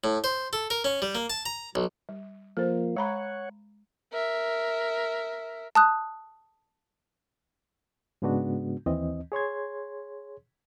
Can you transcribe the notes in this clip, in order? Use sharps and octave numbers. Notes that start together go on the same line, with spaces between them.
A2
C5
A4
A#4
C#4
G3
A#3
A5
A#5
B1
G3
F3 A#3 A4 C5
G#3 C#5 F#5 A#5 B5
A#4 E5
A5 D#6 F#6
G#2 C#3 G#3 B3 D4 F#4
D#2 E3 C4 D#5
G#4 C#5 C6 G#6